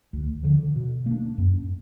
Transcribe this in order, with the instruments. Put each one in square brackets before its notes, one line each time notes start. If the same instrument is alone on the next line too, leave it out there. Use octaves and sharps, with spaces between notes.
[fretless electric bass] D2
D3 F3
B2
A#3 D4
F#2